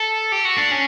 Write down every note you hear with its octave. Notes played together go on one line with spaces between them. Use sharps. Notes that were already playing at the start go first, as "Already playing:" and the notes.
Already playing: A4
G4
F#4
D4
C#4